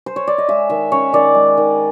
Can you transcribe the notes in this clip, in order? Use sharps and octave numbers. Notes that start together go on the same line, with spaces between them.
C5
C#5
D5
D#5
G#3 E5
D#3 E5
C#4 C#5
D#3 D5
G#3
D#3